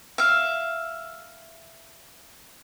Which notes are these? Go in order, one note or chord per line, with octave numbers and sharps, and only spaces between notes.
E5 F5